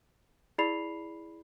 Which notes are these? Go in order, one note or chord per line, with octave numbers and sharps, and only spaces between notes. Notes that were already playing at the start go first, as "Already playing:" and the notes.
E4 G#4 D5 B5 C7 F7